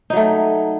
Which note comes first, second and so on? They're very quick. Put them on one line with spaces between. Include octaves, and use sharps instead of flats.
D#4 F#3 A3